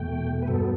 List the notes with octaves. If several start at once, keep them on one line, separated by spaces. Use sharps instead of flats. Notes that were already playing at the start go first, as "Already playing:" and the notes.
Already playing: E2 B2 A3 G5
B4
G2 F#3 B3 A4